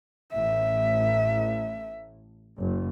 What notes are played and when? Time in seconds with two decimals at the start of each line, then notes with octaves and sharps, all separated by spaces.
0.33 A1 A2 E5
2.58 F#1